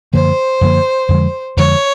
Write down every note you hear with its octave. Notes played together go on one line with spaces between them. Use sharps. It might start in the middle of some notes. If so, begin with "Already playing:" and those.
F#2 D3 F3 A#3 C5
F#2 D3 F3 A#3
F2 D3 F3 G#3
F2 D3 F3 G#3 C#5